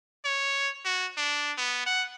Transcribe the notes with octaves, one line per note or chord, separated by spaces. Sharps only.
C#5
F#4
D4
B3
F#5